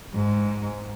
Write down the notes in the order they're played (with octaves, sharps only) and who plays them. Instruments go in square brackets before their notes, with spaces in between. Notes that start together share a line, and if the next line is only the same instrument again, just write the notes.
[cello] G#2